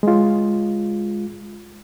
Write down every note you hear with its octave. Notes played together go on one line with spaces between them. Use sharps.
G#3 F4